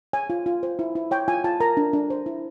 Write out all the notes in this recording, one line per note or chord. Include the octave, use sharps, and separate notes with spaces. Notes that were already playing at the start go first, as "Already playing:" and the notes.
C#5 G#5
F4
F4
C5
E4
E4
C#5 G5
F4 G#5
F4 A5
A#4 A#5
D4
D4
C5
E4